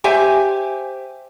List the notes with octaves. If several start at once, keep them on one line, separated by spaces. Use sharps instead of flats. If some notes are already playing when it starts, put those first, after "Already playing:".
G4 C5 E5 G#5